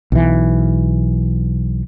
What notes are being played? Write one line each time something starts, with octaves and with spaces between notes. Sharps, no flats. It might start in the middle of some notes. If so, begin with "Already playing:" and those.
B1 E3